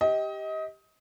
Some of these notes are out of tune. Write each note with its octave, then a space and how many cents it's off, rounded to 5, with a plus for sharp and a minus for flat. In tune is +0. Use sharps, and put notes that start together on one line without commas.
G4 +0 D#5 +25